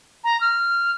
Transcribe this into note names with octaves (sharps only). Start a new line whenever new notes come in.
A#5
F6